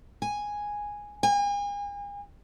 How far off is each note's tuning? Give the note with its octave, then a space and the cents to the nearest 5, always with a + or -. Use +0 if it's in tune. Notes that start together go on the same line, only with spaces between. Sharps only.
G#5 -5
G#5 -40